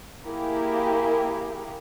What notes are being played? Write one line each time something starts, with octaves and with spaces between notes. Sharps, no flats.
A#3 E4 G4 G#4 A#4